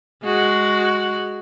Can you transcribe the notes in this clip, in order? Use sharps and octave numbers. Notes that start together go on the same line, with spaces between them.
G#3 F#4